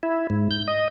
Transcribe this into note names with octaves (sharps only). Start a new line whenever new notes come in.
E4
G#2
G6
D#5